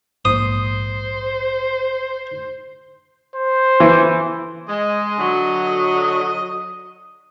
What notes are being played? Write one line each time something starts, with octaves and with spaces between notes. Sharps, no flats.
A#1 G#2 A#3 C5 D#6
C5
E3
G#3 D#5
D3 F#3